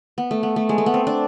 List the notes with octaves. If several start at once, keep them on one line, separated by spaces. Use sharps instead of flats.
B3
A3
B3
A3
G#3
A3
B3
C4
D4